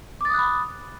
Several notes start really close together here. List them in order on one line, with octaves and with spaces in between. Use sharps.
D6 A6 D#6 F#6 B5